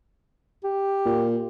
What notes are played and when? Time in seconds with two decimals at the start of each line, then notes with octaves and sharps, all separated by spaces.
0.64 G4
1.05 A#2